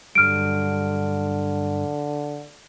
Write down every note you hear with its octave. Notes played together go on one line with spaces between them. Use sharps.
G2 D3 F#3 G3 F6 D7